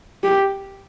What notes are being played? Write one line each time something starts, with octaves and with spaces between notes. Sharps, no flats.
G4